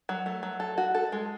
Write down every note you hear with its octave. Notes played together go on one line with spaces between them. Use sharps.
F#3
A3
F#3
A4
F#4
A4
G#3